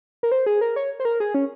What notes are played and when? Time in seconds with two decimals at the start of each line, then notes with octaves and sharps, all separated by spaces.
0.23 A#4
0.31 C5
0.46 G#4
0.61 A#4
0.76 C#5
1.00 C5
1.05 A#4
1.20 G#4
1.34 C#4